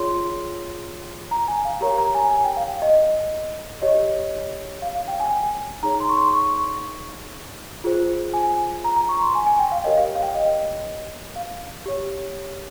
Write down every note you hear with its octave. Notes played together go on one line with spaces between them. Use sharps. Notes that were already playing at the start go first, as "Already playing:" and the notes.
Already playing: F4 G#4 C#5 C6
A#5
G#5
F5
G4 A#4 C#5 A#5
A#5
G#5
G#5
G5
F5
D#5
G4 C#5 D#5
F5
F5
G5
G#5
D#4 G#4 C#5 A#5
C6
C#6
C6
C#6
F4 G#4 C5
G#5
A#5
A#5
C#6
C6
G#5
G#5
G5
F5
G4 A#4 C#5 D#5
F5
F5
G5
D#5
F5
G4 C#5